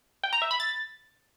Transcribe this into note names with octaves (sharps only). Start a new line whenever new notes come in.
G5
A#5
E5
B5
A6